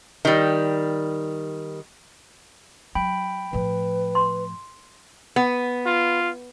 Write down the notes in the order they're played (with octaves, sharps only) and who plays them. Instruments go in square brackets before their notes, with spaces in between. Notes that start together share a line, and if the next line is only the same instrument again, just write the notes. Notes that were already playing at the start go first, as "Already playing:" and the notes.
[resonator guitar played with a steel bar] D#3 G3
[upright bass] F#3 [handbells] G5 B5
[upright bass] A2 F3 [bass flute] B4
[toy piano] C6
[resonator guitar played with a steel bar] B3
[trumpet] F4